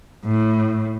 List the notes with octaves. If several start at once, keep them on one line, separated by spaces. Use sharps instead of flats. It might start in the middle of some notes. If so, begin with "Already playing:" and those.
A2